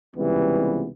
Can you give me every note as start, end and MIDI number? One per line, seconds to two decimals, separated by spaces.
0.16 0.89 37
0.16 0.89 48
0.16 0.89 52
0.16 0.89 55
0.16 0.89 59